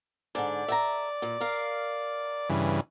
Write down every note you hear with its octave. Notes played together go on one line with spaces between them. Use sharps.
G#2 D3 D5
E5 G5 A#5
A#2
A#4 F5
G2 C#3 E3